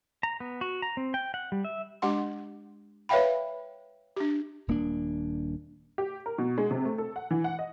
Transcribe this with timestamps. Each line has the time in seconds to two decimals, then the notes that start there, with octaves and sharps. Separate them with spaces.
0.23 A#5
0.40 B3
0.61 F#4
0.82 A#5
0.97 C4
1.14 G5
1.34 F#5
1.52 G3
1.64 E5
2.02 G#3 D4 G4 F#5 C6
3.09 B4 C#5 E5 F5 G5 B5
4.16 D4 G4
4.68 D#1 A#3 D4
5.98 G4
6.26 A#4
6.38 B2
6.58 G#3
6.71 C3
6.85 A3
6.98 A4
7.16 F#5
7.31 E3
7.44 F#5
7.59 D#5